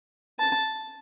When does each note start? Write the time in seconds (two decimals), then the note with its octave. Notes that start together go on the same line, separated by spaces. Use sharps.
0.39 A5